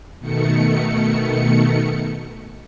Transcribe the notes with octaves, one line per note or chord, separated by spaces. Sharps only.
B2 D#3 A3 C#7